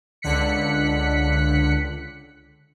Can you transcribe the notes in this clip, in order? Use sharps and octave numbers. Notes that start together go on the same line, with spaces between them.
C#2 D3 F#6 B6 C#7